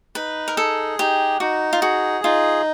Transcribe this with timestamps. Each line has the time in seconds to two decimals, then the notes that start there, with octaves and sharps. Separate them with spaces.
0.15 D#4 B4
0.48 A#4
0.56 G#4 A4
0.99 D#4 G4
1.40 D#4 F#4
1.73 F4
1.82 F#4 G#4
2.24 D#4 F4